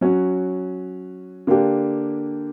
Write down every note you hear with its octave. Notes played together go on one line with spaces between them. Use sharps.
F#3 C#4 F#4
D3 A#3 D4 G4